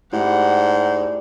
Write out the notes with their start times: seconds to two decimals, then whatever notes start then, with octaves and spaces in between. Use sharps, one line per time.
0.12 G#2 G3 A3 E4 G4 F#5